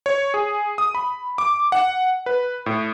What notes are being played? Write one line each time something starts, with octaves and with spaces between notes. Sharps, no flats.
C#5
G#4
D#6
B5
D6
F#5
B4
A2